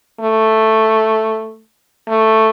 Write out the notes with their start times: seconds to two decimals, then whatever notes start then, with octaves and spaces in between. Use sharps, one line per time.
0.21 A3
2.08 A3